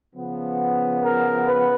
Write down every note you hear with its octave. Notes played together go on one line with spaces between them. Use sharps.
C#3 F3 B3
A#4
B4